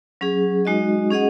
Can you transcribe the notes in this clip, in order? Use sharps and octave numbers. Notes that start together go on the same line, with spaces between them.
F#3 C#4 G#4
G#3 D#4 F#4 D#5
C#4 G#4 D#5 F#5